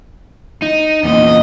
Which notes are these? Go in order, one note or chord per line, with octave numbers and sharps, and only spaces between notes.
D#4
E2 A#2 D#5